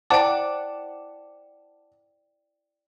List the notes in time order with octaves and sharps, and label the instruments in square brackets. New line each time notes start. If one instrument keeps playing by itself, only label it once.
[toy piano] E4 C5 [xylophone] D5 G5 [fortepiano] F#5 A5 D6